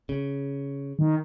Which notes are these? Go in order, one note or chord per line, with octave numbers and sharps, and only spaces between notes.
C#3
D#3